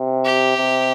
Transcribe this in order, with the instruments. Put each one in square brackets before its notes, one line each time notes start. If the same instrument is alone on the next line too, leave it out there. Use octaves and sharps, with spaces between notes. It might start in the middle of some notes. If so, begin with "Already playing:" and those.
Already playing: [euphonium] C3
[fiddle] G4
[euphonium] C3